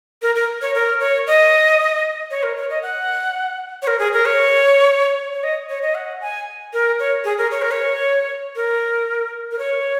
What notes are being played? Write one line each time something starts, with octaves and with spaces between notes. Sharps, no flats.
A#4
A#4
C#5
A#4
C#5
D#5
C#5
A#4
C#5
D#5
F#5
C#5
A#4
G#4
A#4
C#5
C#5
D#5
C#5
D#5
F#5
G#5
A#4
C#5
G#4
A#4
C#5
A#4
C#5
A#4
A#4
C#5